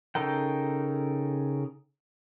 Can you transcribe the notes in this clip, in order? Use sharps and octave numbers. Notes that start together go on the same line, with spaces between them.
C#3 D#4 A4 A#4 G5